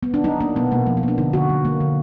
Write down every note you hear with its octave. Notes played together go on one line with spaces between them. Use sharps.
B3
D4
F#3 D#4
A#3 D4
B2 B3
B2 A#3
F3 A#3
B3
A#3 D4
D3 D#4
D3 F#4
F#3
A#3
D3